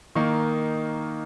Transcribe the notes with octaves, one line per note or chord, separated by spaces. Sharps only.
D#3 A#3 D#4 C#6